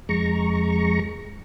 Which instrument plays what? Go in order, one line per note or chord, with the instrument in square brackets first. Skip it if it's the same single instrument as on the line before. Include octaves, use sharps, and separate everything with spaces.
[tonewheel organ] F2 G#3 A#5 C#6